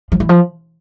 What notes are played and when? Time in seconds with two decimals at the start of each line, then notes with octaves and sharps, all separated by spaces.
0.12 F3
0.20 E3
0.29 F3